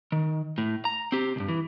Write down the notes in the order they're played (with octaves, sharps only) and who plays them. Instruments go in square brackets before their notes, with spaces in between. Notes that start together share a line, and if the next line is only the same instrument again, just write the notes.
[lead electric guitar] D#3
A2
A#5
C4 G4
C2 G2
E3